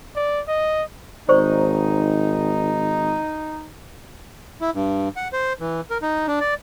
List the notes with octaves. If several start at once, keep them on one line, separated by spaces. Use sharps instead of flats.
D5
D#5
G#1 D#4 C5 D5 C#6
E4
G2
F#5
C5
E3
A#4
D#4
D4
D5